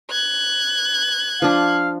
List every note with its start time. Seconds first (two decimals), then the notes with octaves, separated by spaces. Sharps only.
0.11 F#6 G#6
1.42 F3 D4 F5